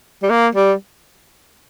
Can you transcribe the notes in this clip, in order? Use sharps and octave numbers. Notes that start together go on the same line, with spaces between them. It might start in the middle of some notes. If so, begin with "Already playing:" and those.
G3
A#3
G3